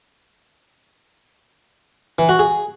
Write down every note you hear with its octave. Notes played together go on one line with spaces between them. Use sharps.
E3
F#4
G#4